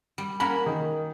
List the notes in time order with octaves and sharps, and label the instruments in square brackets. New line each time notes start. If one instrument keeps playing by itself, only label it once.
[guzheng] G3
[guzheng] A#3 C#4 F#4 [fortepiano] B5
[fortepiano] D#3